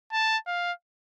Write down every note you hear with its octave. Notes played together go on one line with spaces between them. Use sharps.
A5
F5